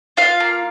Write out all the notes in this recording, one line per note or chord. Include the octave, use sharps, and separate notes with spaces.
F4 F5
A#3